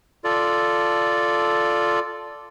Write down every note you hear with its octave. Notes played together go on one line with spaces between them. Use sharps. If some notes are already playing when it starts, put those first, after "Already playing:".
F4 A4 D5